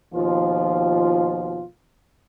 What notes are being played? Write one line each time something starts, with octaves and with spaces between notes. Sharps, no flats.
D#2 B2 F3 F4